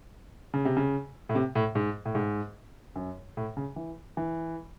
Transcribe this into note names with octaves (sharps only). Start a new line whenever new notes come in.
C#3
C3
C#3
A2
C3
A2
G#2
A2
G#2
F#2
A2
C#3
E3
E3